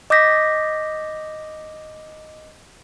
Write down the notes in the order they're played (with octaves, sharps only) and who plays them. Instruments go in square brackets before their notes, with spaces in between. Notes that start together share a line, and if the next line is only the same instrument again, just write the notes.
[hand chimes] D#5 D6 D#6 G6 A#6 B6